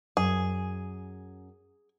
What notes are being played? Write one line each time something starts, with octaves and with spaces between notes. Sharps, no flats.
F#2 G#4